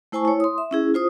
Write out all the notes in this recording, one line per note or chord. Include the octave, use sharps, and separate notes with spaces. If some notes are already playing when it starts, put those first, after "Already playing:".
A3 E4 C5 G#5 A5 C#6
E4 C#5
C6 D#6
E5
C#4 E4 G#4
F4 C5 D#6